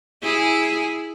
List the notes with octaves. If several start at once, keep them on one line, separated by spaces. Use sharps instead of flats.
E4 G#4